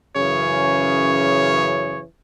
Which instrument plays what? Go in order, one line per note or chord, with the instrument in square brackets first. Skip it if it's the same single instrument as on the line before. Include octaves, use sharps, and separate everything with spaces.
[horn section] F#2 C#3 E3 C#4 G#4 C#5